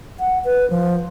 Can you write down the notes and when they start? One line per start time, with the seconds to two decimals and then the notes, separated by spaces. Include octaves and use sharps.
0.19 F#5
0.45 B4
0.70 F3